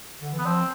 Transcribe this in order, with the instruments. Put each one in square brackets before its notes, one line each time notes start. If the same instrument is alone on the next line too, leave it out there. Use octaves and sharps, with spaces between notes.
[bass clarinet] D3
E3
[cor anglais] B3
[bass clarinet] F3 [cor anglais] C4